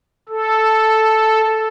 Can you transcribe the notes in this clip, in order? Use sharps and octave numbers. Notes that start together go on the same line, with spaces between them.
A4